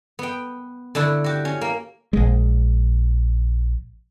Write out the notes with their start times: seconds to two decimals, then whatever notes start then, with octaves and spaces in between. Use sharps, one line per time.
0.19 B3 G5
0.95 D3 A3 D4 E4
1.24 F#4 G4
1.45 C#4
1.61 A#3
2.13 A#1 G#3